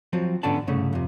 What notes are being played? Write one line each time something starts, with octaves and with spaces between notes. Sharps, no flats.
F3 F#3 C4
G#2 D3 B3 C#4 D5 A5
C2 G2 C#3 A3
F2 C3